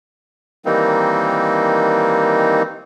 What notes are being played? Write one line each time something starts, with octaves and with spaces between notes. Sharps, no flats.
D#3 E3 G3 A#3 C4 D#4